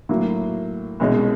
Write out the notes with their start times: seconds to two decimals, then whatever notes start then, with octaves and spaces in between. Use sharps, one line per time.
0.09 A2 F#3 A#3
1.00 C2 B2 G#3 C#4